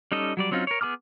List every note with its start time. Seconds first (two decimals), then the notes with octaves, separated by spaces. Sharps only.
0.12 G3 C#4 D#4 A4 D#5
0.37 F#3 G3 D5
0.51 F#3 C4 C#4 D#4 F4
0.67 A#4 C#5
0.81 B3 G#4 A#5 D6 F6